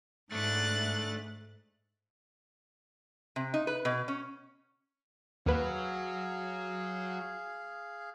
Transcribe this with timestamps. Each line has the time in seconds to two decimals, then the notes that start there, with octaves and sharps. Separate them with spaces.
0.32 G#2 A3 D4 F#6 A6
3.36 C3
3.54 D#4
3.67 B4
3.85 B2
4.08 C#4
5.46 D#2 F#3 G#4 B4 F5